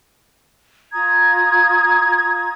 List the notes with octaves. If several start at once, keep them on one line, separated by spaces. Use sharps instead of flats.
F4 A#5 D#6 G#6